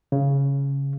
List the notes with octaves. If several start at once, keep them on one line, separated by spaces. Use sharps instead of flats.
C#3